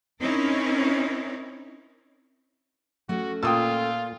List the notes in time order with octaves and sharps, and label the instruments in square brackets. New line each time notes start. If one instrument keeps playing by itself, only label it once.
[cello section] C4 C#4 D#4 E4 A#4 C#5
[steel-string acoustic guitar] A3 C#4 [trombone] F#4
[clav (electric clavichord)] A#2 A5 [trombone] F4 [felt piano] G5 D#6 E6